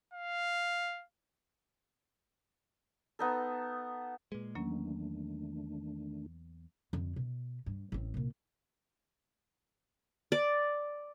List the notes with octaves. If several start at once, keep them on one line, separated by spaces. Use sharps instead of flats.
F5
B3 D#4 A4
A#2 G#3 B4
E2 D#3 F#3 A3 A#3 C#4 D4
F2 D3
B2
G2
A1 C4
C2 A#2
D5